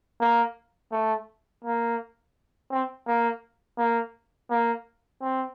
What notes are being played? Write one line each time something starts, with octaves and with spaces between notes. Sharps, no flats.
A#3
A3
A#3
C4
A#3
A#3
A#3
C4